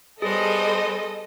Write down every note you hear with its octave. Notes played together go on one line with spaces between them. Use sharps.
G3 B3 G#4 A4 C5 D#5